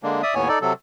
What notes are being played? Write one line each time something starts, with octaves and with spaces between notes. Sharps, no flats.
D3 G#3 A#3 D4
D5 E5 D#6
D#2 A2 B3 C#5 G#5
D#4 A4 D5
C3 F#3 A4